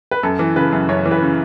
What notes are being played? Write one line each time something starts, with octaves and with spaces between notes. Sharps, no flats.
B4
F#2 A4
E3
C#3 B4
F#2
F#2 C#5
E3
B4
C#3